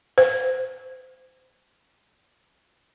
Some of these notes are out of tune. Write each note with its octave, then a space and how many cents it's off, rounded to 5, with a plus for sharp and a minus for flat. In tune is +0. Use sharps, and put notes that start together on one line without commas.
C5 -25